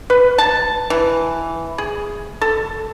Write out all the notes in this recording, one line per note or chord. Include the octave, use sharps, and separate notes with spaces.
B4
A5
E3
G#4
A4